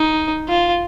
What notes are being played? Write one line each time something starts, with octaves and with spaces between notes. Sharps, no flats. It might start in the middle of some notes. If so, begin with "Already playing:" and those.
Already playing: D#4
F4